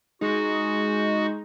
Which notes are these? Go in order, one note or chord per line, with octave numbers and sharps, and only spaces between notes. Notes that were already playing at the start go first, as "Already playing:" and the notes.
G#3 D#4 F#4